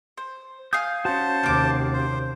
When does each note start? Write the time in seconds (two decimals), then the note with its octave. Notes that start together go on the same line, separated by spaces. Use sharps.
0.17 C5
0.73 F5 G#5 D#6 G6
1.05 C#4 F#4 C5 A5
1.43 D#2 C3 A#3 D6
1.93 C5